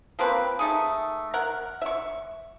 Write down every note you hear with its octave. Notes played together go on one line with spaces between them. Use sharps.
F3 A#3 C4 B4
A3 D#4 G#4
A#4 F#5
E5 C#6